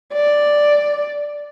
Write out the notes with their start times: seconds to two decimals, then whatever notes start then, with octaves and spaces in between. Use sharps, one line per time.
0.13 D5